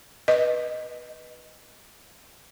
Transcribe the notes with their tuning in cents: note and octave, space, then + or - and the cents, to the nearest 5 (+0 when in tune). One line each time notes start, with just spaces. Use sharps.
B4 -15 D#5 -10